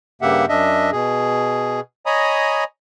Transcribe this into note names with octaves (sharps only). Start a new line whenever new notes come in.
G2 C#3 A#3 G4 E5 F#5
F#2 D4 D#5 E5
B2 G#4
C#5 D#5 G#5 A#5 B5 D#6